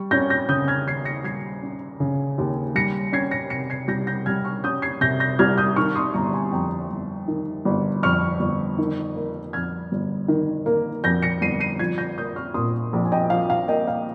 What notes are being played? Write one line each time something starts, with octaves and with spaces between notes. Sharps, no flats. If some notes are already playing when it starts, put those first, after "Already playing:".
Already playing: G3 C#6
C#4 G6 A#6
G6 A#6
C#3 D#6 G6
F6 G#6
D#2 G#6 C7
A#6 C#7
G3 G#6 C7
C#4
C#3
D#2
G3 A#6 C#7
C#4 G#6 C7
A#6 C#7
C3 A#6 C#7
G#6 C7
C2 G6 A#6
G6 A#6
G3 F6 G#6
C#6 F6
C#4 D#6 G6
G#6 C7
C3 G6 A#6
G6 A#6
C2 F6 G#6
D#6 G6
D#3 C#6 F6
C6 D#6
G1 A#5 C#6
G#5 C6
F2 G5 A#5
G1
D#3
G1
F2 C#6 F6
G1
D#3
A#3
F2 F6 G#6
G1
D#3
A#3
F2 G6 A#6
A#6 C#7
G1 C7 D#7
C7 D#7
F3 G#6 C7
G6 A#6
A#3 D#6 G6
C#6 F6
A#2 C6 D#6
A#1
G#5
D#5 G5
F3 F5
F5
A#3 D#5 G5
F5